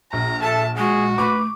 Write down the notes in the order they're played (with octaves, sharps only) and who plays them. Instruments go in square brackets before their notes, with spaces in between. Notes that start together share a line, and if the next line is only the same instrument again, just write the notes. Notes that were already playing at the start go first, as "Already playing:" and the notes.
[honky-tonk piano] A#1 [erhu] A#5
[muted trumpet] A4 [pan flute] E5 [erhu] A5
[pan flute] G#3 [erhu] F#4 [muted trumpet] G#4
[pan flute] A3 [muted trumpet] B4 [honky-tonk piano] C#6 D6